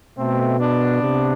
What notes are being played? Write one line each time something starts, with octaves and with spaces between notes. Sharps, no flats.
B2 A3 C4
B3 D4
C3